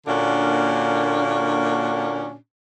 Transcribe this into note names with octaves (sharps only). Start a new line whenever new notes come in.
A#2 D3 A#3 C#4 D4 F#4